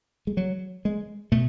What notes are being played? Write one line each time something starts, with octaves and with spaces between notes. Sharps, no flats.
G#3
F#3
G#3
B2 A3